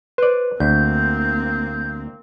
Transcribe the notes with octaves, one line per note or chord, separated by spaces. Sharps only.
B4 C5 D5
D2 A#3 C4 G6